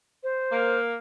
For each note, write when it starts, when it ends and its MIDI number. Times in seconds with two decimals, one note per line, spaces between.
0.23 0.79 72
0.52 0.95 58